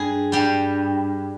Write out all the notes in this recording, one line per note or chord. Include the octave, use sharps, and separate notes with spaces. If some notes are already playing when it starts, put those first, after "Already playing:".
Already playing: G2 G3 G#4
G2 G3 G4